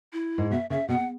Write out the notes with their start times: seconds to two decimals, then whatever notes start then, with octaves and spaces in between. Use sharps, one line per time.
0.13 E4
0.38 G#2
0.51 B2 E5
0.70 C#3 E5
0.89 B2 F#5